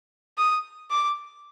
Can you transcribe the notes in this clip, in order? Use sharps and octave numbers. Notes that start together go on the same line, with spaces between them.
D#6
D6